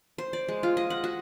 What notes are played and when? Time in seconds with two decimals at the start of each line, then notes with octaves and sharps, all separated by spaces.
0.18 C5
0.33 D5
0.48 G#3
0.63 F4
0.77 D#5
0.90 F#5
1.04 F#4